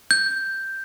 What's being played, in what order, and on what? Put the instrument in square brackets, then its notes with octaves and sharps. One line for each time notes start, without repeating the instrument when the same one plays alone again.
[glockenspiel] G6